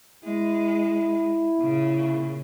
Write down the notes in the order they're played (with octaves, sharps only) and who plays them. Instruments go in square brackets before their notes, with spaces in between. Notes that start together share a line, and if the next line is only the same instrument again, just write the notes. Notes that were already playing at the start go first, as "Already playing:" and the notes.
[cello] G#3 [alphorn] E4
[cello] A#2 C#3